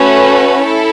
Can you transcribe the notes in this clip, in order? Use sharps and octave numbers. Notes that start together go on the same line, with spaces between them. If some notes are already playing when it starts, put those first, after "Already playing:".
Already playing: A3 C#4 F#4 B4
E4 A4